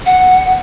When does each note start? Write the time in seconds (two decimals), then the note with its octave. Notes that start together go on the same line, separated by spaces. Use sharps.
0.06 F#5